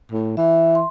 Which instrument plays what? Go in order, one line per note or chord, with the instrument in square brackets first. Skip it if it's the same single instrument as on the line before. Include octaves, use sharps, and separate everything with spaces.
[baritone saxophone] A2
[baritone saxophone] E3 [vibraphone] E5
[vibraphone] C6